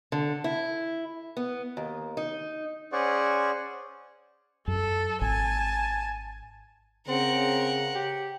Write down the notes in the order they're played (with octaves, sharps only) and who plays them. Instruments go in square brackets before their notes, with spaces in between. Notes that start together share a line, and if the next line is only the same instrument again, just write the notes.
[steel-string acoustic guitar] D3
E4
B3
D#2
D#4
[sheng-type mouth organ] C#4 G#4 C5 D5 F#5 C#6
[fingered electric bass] F#2 [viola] A4
[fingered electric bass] G#1 [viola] G#5 A5
[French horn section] C#3 [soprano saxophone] C4 [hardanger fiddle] A#4 F#5
[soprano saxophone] G4